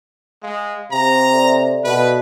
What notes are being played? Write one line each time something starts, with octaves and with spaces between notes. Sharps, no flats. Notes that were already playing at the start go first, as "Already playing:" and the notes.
G#3 F5
C3 A#5
A4 D5 E5
B2 B4